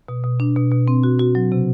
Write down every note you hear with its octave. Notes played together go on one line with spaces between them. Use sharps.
B2
B2
D4
B2
B2
C4
F#4
F#4
F#3
C3